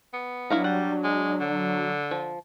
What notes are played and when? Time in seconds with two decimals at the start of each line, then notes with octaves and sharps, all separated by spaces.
0.14 B3
0.50 F#3 D4 E4 F5 A#5
0.64 G3 F#5
1.04 G#3
1.40 D3
2.11 F3